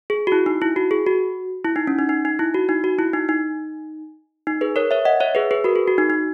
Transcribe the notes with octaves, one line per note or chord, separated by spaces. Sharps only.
G#4
F#4
E4
D#4
E4
F#4
G#4
F#4
E4
D#4
C#4
D#4
D#4
D#4
E4
F#4
D#4
F#4
E4
D#4
D#4
D#4
G#4 B4
A#4 C#5
C#5 E5
D#5 F#5
C#5 E5
G#4 B4
G#4 B4
F#4 A#4
G#4
F#4
D#4
D#4